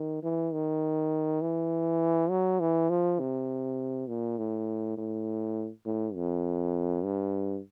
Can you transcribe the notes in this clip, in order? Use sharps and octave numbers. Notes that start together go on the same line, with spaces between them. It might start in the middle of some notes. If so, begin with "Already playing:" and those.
Already playing: D#3
E3
D#3
E3
F#3
E3
F3
C3
A#2
A2
A2
A2
F2
G2